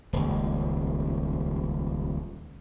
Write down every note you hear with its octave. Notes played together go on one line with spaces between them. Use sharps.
D#1 C#2